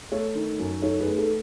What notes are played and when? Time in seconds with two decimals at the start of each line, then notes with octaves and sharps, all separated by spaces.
0.12 A3 A4 C#5
0.35 D#3
0.60 F#2
0.82 D#4 A4 C#5
1.00 G#4 B4
1.07 A3
1.18 A4